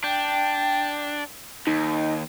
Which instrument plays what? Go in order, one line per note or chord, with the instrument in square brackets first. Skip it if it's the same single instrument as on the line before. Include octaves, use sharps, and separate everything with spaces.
[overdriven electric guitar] D4 [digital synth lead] G5
[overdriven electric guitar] D#2 [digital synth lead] D#4